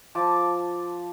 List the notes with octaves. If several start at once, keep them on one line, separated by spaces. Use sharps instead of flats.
F3 A5 D6